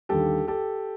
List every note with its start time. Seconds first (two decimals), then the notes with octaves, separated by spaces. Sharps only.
0.09 D#2 D3 G3 G4 A4
0.48 G4 A4